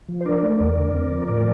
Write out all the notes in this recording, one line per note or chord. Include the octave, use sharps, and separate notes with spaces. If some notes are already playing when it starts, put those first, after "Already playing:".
F3
C5
D4 A#4 D5
A3
E2 A#4 D5
D3
C4
F3
A2 A#4 D5